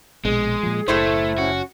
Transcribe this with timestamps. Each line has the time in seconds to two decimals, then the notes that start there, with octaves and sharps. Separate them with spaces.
0.25 A#1 B2 G#3 G#4
0.63 A#2 F3
0.88 F#1 A2 A3 E4 C5
1.38 C#4 F#4